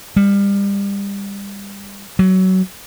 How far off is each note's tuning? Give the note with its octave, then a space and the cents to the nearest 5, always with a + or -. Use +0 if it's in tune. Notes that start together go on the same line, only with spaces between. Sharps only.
G3 +30
F#3 +20